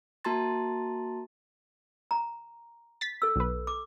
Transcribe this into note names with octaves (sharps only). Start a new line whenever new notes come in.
A#3 F#4 A5 A#5 C6 A6
A#5
A6 B6
A4 E6
B1 B4
D6